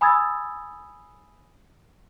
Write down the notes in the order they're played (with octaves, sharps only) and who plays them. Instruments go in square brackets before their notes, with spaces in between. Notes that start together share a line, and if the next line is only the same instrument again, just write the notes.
[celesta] G#5 B5 D#6 E6 G#6 A6